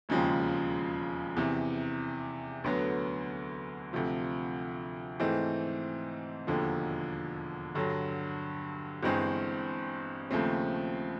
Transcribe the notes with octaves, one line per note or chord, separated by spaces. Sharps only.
E1 D#2 C#3 F3 G#3
E2 C3 E3
D2 D3 F#3 B3
D2 C3 F3
G#2 E3 A3 C4
E1 D#2 D3 F3
G2 D3 F#3
G1 G2 E3 G#3 C4
D#2 C#3 F3 A3 C4